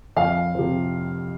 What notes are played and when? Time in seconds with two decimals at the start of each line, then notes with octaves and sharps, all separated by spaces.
0.16 F2 F5
0.55 C3 F3